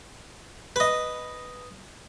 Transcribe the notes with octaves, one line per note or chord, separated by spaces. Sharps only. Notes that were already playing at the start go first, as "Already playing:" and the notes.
B4 D#5